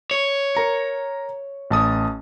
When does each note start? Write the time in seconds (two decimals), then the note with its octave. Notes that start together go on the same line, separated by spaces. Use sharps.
0.11 C#5
0.55 A#4 A#5 C#7
1.71 A1 A5 D#6